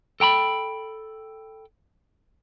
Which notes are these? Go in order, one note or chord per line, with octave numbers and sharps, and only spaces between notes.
A4 G5 A#5 B5